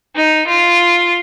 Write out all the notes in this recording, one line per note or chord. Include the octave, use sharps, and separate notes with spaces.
D#4
F4